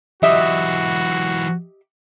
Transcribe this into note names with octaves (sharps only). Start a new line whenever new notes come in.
E3 F#3 F#4 G4 D#5 E5